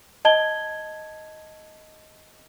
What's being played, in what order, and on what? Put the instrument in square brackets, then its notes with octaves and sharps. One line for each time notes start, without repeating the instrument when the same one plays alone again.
[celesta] D#5 A5 G#6 G7